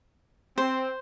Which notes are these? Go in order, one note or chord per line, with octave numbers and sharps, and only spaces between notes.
C4 C5